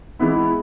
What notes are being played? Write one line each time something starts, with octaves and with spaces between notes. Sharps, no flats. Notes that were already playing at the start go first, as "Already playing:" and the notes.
E3 G#3 B3 E4